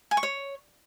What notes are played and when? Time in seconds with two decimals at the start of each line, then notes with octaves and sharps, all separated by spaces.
0.11 G#5
0.17 C#6
0.23 C#5